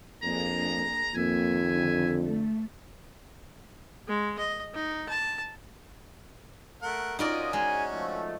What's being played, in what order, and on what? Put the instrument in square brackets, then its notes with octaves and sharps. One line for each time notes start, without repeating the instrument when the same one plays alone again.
[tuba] F2 [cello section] A#3 D4 G#4 [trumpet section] A#5
[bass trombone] F2 [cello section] D#3 [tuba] A#3 [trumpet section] E5 G#5
[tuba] D3
[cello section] A3
[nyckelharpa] G#3
D#5
D#4
A5
[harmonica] A3 A#4 F#5
[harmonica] C#4 F#4 [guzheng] D#4 A#4 D5 [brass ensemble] F4 D#5
[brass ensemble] G#2 G#5 [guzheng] G#3
[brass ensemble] F3 A3